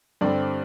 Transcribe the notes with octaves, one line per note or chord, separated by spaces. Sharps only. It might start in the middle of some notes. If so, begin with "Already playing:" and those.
G2 D3 G3 C4 D5